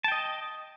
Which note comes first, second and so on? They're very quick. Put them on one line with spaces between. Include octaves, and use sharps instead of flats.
A5 G5 D#5